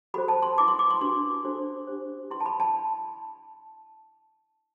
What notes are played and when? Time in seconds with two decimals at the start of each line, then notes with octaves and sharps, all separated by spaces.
0.14 F#4 A4 C5 B5
0.28 A5
0.42 C6
0.58 E4 B4 D6
0.68 C6
0.79 D6
0.90 C6
1.01 D4 F#4 B4 C6
1.44 D4 F#4 A4 C5
1.87 D4 G4 C5
2.30 E4 B4 C6
2.40 A5
2.46 B5
2.60 A5